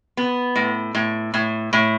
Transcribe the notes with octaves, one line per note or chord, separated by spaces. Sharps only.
B3
A2
A2
A2
A2